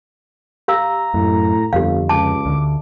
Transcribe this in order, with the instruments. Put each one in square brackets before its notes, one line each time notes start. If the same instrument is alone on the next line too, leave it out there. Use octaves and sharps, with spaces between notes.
[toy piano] G4 F5 E6 [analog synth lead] A#5
[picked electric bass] F#2 [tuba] A2
[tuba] G1 [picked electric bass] F2 D3 [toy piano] G4 F5
[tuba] C#2 [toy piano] A5 [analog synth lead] D6
[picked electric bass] D2 D3